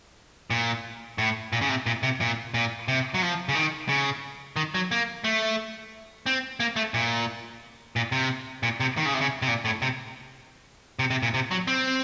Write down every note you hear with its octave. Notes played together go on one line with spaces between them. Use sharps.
A#2
A2
A#2
C#3
C3
A#2
C3
A#2
A#2
C3
F#3
F3
C#3
D#3
C#3
D#3
F#3
A#3
A3
C4
A#3
A3
A#2
A#2
C3
A#2
C3
D#3
C#3
C3
C#3
C3
A#2
A2
C3
C3
C3
A#2
C3
F#3
C4